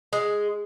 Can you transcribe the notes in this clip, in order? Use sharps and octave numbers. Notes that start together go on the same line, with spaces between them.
G#3